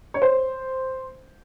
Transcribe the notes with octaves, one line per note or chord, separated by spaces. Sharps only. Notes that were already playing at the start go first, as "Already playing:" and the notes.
C#5
C5